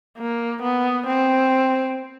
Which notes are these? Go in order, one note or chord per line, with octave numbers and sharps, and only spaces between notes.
A#3
B3
C4